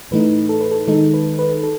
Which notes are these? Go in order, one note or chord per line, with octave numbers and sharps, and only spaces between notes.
A2 E3 A3 D#4 B4
A4
B4
A4
D#3 G#3 D#4 A4
B4
B4
A4